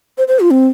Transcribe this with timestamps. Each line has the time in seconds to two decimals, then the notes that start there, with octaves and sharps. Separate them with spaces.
0.18 C5
0.28 C5
0.40 F4
0.51 C4